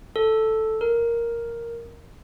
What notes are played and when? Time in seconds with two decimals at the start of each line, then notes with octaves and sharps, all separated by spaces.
0.16 A4
0.81 A#4